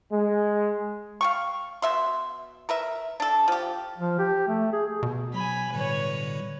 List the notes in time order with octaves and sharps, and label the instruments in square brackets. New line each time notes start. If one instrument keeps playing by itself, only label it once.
[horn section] G#3
[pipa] F5 G5 C#6
B2 E5 C6
A#4 B4 E5
D4 A4
F3 G4
[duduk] F3
G4
A3
G#4
[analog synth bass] B2
[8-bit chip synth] F#3 [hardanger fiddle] G#5 B5
[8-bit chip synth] A2 D3 G3 [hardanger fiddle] B4 C#5